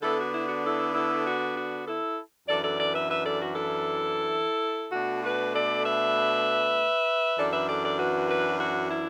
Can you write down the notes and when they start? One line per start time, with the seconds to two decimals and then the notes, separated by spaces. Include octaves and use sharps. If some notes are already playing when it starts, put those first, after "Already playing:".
0.03 D3 B3 D4 E4 A4
0.19 F#4
0.33 E4
0.48 F#4
0.64 E4 A4
0.94 E4 A4
1.26 F#4
1.56 F#4
1.87 E4 A4
2.47 F#2 E3 D4 A4 D5
2.63 A4 D5
2.78 A4 D5
2.94 B4 E5
3.09 B4 E5
3.24 A4 D5
3.40 F#4
3.55 E4 A4
4.92 B2 A3 D4 F#4
5.23 F#4 B4
5.54 A4 D5
5.84 B4 E5
7.38 F#2 E3 D4 A4 D5
7.52 B4 E5
7.68 A4 D5
7.84 A4 D5
7.98 F#4 B4
8.29 F#4 B4
8.59 F#4
8.91 E4